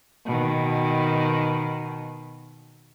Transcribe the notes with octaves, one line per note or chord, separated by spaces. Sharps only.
B2 D#3